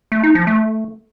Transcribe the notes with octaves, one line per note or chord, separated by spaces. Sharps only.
A3
D#4
F3
A3